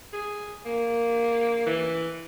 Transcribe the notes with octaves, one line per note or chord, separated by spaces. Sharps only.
G#4
A#3
E3